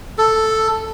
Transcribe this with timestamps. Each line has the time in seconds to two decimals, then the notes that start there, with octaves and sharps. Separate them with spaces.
0.18 A4